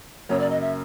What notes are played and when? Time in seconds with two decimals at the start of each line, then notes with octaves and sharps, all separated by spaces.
0.29 F#2 C#3 F#3 A#3 C#5
0.40 D5
0.51 D#5
0.61 E5